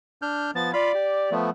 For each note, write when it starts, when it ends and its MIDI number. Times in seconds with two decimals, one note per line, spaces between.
0.22 0.51 62
0.22 0.51 89
0.22 0.51 91
0.55 0.72 53
0.55 0.72 59
0.55 0.73 93
0.73 0.92 65
0.73 1.33 74
0.73 0.92 77
0.73 0.92 83
0.94 1.30 67
1.31 1.50 53
1.31 1.50 57
1.31 1.50 59